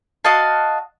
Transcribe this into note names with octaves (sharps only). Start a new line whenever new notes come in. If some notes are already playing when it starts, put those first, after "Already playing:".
F#4 D#5 F5 A5